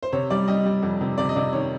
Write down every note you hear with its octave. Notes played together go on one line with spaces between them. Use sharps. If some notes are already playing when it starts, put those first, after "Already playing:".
C5
C3 C#5
G3 D5
G3 D#5
G3
F2
C3
C3 D5
D#5
C3 D5
D#3 C#5